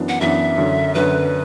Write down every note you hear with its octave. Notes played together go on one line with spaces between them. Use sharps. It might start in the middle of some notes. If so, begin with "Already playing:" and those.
Already playing: F#2 E3 B3 D4
F#5
F#2 E3 B3 D4 E5
F#2 D3 F#3
F#2 D3 F#3 B4